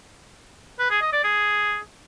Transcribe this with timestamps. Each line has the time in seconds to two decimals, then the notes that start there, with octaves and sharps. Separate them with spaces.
0.79 B4
0.90 G#4
1.01 D#5
1.12 D5
1.24 G#4